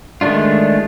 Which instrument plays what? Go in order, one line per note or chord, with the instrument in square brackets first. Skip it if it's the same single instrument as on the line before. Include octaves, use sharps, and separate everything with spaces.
[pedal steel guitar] D#3 G#3 A3 D4 F4